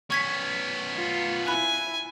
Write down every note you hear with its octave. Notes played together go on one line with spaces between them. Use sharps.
B3 C#4 C#6 G#6 B6
F4
E4 G#5 B5 F#6